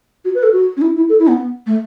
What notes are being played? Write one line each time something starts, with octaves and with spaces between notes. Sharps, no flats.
F#4
B4
A4
F#4
C#4
E4
E4
A4
E4
B3
A3